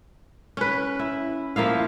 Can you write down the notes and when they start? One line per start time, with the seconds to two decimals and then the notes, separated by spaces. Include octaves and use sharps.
0.57 C#4 B4
0.99 E4
1.56 F3 A#3 E4 F5